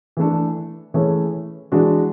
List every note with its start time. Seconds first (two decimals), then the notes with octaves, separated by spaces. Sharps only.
0.17 E3 A3 D4 A4
0.94 E3 A3 C#4 G#4
1.72 E3 G#3 D4 F#4